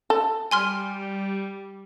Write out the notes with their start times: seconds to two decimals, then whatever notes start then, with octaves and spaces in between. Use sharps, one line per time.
0.10 A4
0.51 G3 G#5 C6 F6